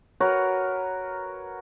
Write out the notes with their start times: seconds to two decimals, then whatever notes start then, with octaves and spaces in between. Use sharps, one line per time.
0.20 F#4 A#4 B4 C#5